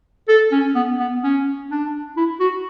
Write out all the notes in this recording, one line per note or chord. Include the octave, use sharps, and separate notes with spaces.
A4
C#4
B3
B3
C#4
D4
E4
F#4